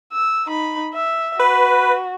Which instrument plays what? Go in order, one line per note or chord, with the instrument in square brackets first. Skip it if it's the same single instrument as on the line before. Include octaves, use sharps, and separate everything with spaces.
[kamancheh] E6
D#4 B5
E5
[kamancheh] F#4 [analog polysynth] B4